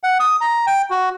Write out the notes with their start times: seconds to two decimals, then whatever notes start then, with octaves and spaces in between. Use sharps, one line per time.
0.03 F#5
0.20 D#6
0.41 A#5
0.67 G5
0.91 F#4